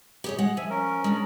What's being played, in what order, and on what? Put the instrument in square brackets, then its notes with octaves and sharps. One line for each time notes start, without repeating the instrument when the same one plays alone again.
[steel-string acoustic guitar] G4 G#4 C#5
G#3 F#5
[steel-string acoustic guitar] F3 [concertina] E5 G#5
[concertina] C#4 A#4
[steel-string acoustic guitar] G#3 D4